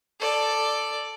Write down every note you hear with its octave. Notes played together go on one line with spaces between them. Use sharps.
A4 D5